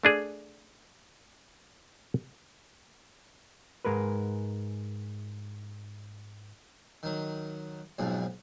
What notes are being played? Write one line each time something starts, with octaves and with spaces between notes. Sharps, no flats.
A3 D4 G#4
G#2 G#3 A#4 B4
D#3 F#3
B1 F2 G#2 B2